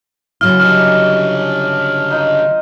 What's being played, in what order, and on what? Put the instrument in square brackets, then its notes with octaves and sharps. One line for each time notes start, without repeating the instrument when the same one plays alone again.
[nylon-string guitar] C#3 F#3 E4 [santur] F5 [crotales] F6
[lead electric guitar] D3 G3 [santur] D#5 E5 D6 [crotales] F6
[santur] D#4 F4 D#5